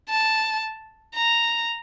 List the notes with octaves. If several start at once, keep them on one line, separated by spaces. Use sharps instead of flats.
A5
A#5